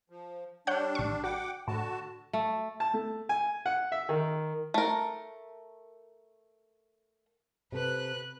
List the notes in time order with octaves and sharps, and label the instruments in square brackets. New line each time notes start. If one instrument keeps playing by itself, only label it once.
[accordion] F3
[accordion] G3 D4 [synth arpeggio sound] C#5 F#5 G6
[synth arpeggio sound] A1 C#6
[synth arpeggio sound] F#4 [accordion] F#5 G5 D6
[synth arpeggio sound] A2 [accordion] D3 F#4 A5
[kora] A3
[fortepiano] A5
A3
G#5
F#5
E5
D#3
[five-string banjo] A3 A#4
[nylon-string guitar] C3 A4 [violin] B4 F#6